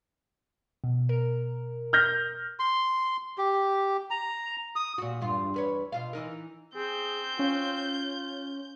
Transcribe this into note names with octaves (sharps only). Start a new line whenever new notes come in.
B2
A#4
F6 G6 A#6
C6
G4
A#5
D#6
A#2 F#4
E2 G2 F4
E2 B4 C#5
B2 F4 F5
E3 D#4 A#4
C4 G#4 G6
C#4 F4